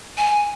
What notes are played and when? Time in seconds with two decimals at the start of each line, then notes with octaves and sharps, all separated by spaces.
0.18 G#5